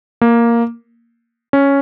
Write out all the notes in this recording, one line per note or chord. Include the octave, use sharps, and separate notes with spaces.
A#3
C#4